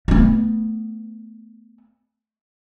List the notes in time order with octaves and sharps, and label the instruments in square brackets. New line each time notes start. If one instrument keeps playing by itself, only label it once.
[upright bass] A3 B3